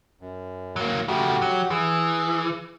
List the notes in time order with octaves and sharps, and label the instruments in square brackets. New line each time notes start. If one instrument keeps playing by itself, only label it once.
[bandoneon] F#2
[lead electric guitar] F#3 A#3
[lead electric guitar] C#3 A3 [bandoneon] F#4 G4
[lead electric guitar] F#3
[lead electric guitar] E3 [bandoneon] G#4